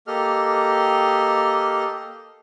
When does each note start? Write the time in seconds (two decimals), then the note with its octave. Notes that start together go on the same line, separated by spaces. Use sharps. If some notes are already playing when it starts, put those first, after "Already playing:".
0.07 A#3 G4 A4 D#5 F6